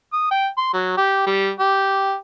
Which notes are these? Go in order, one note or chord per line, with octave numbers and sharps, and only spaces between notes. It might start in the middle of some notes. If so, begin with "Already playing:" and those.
D#6
G5
C6
F#3
G4
G3
G4